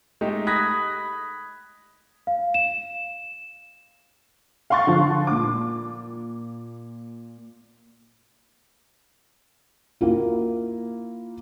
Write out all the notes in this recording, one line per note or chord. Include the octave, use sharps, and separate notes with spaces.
G#3 A3 D#4 G4
B5 D#6 F#6 G#6 A#6 B6
F5
E7
F5 F#5 C6 C#6 F#6 A6
D3 F3
A#2 D6
A#3 E4 F4